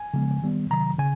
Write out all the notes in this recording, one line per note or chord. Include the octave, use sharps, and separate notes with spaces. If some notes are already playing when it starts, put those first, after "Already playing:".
Already playing: G#5
C#3 F3 G#3 B3
D#3 G3 B3
C3 D#3 F#3 A#5
C#3 G#5